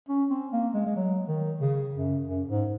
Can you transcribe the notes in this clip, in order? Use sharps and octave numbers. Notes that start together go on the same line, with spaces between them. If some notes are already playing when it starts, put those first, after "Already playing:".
C#4
C4
A#3
G#3
G#3
F#3
D#3
C#3
F#2
F#2
G#2